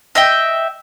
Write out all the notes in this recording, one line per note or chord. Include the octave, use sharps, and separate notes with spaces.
D#5 E5 G5